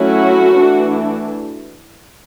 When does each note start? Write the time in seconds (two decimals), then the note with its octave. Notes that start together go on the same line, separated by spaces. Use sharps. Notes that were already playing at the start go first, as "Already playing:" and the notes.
Already playing: F#3 A3 C#4 E4 F#4
0.56 E3 A3 D4